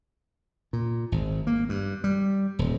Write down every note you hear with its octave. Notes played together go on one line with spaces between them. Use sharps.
A#2
G#1
A#3
G2
G3
D#1